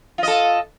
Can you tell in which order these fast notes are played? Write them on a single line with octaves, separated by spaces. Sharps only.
F4 D#5 A4